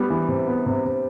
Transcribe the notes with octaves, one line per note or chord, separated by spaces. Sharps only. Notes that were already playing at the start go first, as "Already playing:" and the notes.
Already playing: G3 B3
E3
C3
B3
C3
C3